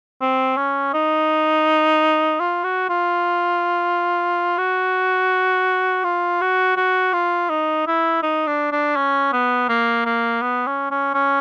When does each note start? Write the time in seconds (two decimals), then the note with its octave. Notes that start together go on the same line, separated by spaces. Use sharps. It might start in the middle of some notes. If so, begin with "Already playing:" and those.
0.21 C4
0.57 C#4
0.94 D#4
2.40 F4
2.64 F#4
2.89 F4
4.58 F#4
6.04 F4
6.41 F#4
6.77 F#4
7.13 F4
7.49 D#4
7.87 E4
8.23 D#4
8.47 D4
8.72 D4
8.96 C#4
9.33 B3
9.69 A#3
10.05 A#3
10.42 B3
10.67 C#4
10.91 C#4
11.14 C#4